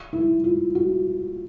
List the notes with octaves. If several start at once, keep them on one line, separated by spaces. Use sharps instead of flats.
E4
F4
F#4